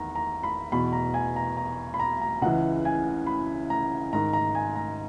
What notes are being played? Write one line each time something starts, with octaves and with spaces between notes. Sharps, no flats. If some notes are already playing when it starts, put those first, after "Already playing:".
Already playing: E2 D#3 A#5
A#5
B5
E2 B2 B5
A#5
G#5
A#5
A#5
B5
A#5
A#5
C#2 C#3 E3 F#5
G#5
B5
A#5
G#2 D#3 A#5
A#5
G#5
A#5